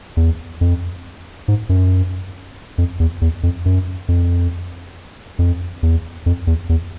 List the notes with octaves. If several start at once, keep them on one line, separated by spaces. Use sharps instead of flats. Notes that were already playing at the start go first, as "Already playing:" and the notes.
E2
F2
G#2
F#2
F2
E2
E2
F2
F#2
F2
F2
E2
F2
E2
E2